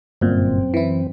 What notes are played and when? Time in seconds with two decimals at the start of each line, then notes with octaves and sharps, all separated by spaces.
0.21 G1 F#2 A#2 C4
0.74 E3 E4